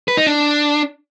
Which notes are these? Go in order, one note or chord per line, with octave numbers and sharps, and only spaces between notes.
B4
D#4
D4